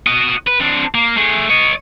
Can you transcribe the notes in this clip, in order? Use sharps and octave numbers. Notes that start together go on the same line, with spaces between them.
F#4 D#5
B4
C4 D4
A#3
A3 G#4
C#5 D#5